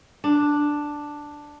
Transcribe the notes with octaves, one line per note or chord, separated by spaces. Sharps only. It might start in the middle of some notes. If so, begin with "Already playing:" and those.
D4